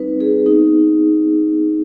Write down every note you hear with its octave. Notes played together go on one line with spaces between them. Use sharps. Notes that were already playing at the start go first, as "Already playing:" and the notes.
Already playing: G3 C4 D#4 B4
G#4
B3 D#4